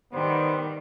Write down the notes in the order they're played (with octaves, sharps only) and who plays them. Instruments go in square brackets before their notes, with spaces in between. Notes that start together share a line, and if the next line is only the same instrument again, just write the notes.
[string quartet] D#3 G3 [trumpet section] B3 C5